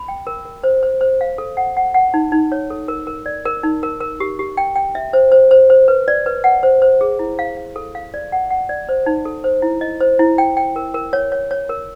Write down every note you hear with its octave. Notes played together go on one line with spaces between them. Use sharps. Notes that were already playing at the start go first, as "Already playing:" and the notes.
Already playing: B5
G5
A#4
A#4
C5
C5
C5
F5
A4
F#5
F#5
F#5
D#4
D#4
C#5
A4
A#4
A#4
D5
A#4
D#4
A#4
A#4
G4
G4
G5
G5
E5
C5
C5
C5
C5
B4
D5
B4
F#5
C5
C5
G#4
E4
F5
F5
A4
F5
D5
F#5
F#5
D5
C5
D#4
A4
C5
E4
D#5
C5
E4
G5
G5
A#4
A#4
C#5
C#5
C#5
A#4